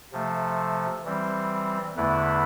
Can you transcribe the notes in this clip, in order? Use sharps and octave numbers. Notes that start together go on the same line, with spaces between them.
C3 F3 A3
E3 G3 C4
E2 D3 A3 E4 B4